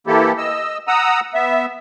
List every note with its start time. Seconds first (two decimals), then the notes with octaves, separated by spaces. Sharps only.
0.07 E3 A#3 E4 G4 A4
0.38 D#5 E6
0.88 F#5 A#5 D#6 E6
1.34 B3 E5